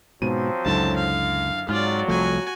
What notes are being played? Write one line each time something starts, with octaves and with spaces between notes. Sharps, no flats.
G#2 B2 F3 F#3 C4 D#7
C#2 F#2 D3 E4 A5
F5
F2 G#2 F#3 F4 D5 F6
C2 F3 A3 F#4 G#5